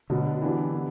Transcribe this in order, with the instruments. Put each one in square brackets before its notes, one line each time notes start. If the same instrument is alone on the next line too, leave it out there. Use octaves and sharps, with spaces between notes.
[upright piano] B2 F#3 B3 [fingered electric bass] D3
[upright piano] E3 B3 D4 G4
B3